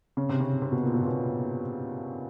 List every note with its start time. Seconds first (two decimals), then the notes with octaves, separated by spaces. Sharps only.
0.17 C#3
0.29 C3
0.40 C#3
0.62 C3
0.72 B2
0.83 A#2
0.94 B2
1.00 A#2
1.07 B2